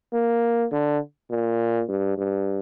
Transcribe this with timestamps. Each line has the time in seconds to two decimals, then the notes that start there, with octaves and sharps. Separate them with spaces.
0.13 A#3
0.72 D3
1.30 A#2
1.89 G2
2.17 G2